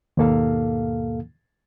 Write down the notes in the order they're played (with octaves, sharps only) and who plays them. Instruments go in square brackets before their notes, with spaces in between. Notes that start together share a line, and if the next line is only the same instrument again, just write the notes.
[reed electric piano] D#2 G#2 B2 A#3 A4 F5